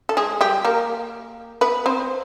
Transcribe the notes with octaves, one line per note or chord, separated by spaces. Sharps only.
A4
G#3 G#4
G3 G4
A#3 A#4
B3 B4
C4 C5